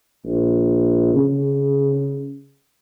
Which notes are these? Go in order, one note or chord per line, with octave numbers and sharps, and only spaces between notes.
A#1
C#3